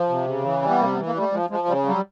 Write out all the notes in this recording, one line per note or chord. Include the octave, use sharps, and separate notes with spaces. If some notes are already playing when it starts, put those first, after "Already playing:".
Already playing: F3
C3
C#3
E3
G3
B3
C3 A#3
B3
E3
A#3
G3 A3
F3 G#3
F3 G#3
C#3 G3
F#3 G3